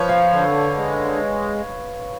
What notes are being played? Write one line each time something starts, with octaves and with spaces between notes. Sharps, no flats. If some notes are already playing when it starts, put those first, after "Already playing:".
Already playing: F3 B4 C#5
F5
D3
G#3